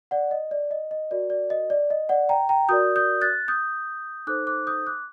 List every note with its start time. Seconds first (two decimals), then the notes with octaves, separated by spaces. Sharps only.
0.11 D5 F#5
0.31 D#5
0.51 D5
0.71 D#5
0.91 D#5
1.11 F#4 A#4 D5
1.30 D5
1.50 D#5
1.70 D5
1.90 D#5
2.09 D5 F#5
2.29 G5 A#5
2.49 G5 A#5
2.69 F#4 A#4 D5 D#6 G6
2.96 D#6 G6
3.21 F#6 A6
3.48 D#6 G6
4.27 D#4 A4 C5 D6 F#6
4.47 D6 F#6
4.67 D#6 G6
4.87 D6 F#6